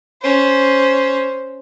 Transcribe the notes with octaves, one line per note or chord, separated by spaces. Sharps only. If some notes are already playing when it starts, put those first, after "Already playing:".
C#4 C5